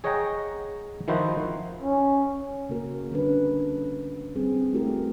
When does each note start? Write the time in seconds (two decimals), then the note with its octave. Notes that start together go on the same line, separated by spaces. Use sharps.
0.04 G#4 C#5 D#5 F#5 G5 A#5
1.08 D#3 F3 D#4 E4 F#4 C5
1.82 C#4
2.69 C#3 A#3 F#4 A#4
3.11 D3 G3 C#4 D4 B4
4.36 G3 C4 G#4
4.73 A3 E4 F#4 G4 A#4